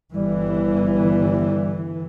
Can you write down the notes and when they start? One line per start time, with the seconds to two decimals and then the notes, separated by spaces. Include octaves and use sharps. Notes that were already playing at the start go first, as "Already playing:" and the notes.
0.13 G1 E3 G3